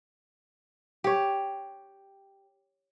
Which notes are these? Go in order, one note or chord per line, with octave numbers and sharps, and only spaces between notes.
G4 C#5